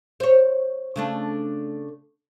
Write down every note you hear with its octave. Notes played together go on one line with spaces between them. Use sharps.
C5 C#5
C#3 A3 D4